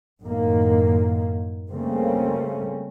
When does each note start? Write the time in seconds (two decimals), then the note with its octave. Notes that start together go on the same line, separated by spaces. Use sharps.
0.22 F#2 A2 D#3 A#3
1.69 C#3 G3 A3 A#3 C4 C#4